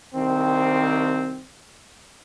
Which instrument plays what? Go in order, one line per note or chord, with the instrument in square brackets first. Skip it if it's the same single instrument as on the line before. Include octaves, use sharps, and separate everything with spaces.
[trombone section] C2 D#3 C4